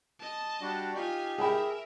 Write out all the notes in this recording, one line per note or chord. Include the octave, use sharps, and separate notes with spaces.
D#5 A5
G3 D4 F#4
D#4 F4 G4 G#5
G#4 A#4 E5 G5 B5